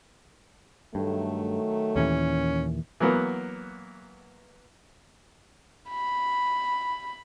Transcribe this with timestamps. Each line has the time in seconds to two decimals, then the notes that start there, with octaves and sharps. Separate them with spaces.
0.95 G2 D#3 F#3 A3
1.96 D#2 A#2 E3 C#4
3.00 E3 F#3 A#3 B3
5.90 B5